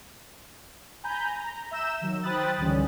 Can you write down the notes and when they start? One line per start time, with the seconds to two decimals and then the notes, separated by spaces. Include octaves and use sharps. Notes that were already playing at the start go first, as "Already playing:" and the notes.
1.04 G#5 A#5 B5 G6
1.27 A#5
1.71 E5 A#5 E6 G6 E7
2.02 D#3 F#3
2.23 C5 G5 B5 D#6 F#6 A6
2.58 C#2 G#2 D3 E3 G3 C#4